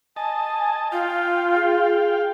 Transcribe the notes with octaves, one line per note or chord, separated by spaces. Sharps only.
D#5 G#5 A5
F4 F5 G5
G#4